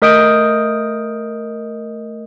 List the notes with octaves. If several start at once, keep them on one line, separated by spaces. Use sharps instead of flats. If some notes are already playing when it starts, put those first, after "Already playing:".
A3 A#4 D#5 D#6 G6 D7